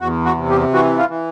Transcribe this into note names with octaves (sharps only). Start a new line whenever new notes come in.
E2 F#4
F#4
C3
G4
E3 F#4
F4
E3